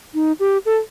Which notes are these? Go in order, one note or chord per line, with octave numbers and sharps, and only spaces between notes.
D#4
G4
A4